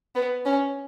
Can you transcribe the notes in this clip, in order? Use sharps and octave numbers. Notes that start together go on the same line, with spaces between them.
B3
C#4